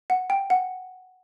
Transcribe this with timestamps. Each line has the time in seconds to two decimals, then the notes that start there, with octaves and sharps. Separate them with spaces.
0.10 F#5
0.30 G5
0.50 F#5